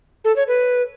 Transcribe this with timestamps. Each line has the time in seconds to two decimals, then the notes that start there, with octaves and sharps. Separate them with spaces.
0.25 A4
0.36 C#5
0.48 B4